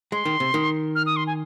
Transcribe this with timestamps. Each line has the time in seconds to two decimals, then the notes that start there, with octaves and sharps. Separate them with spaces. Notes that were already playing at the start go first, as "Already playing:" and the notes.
0.12 G#3 C6
0.25 D#3
0.40 C3
0.54 D#3
0.95 F6
1.06 D#6
1.16 C6
1.27 G#5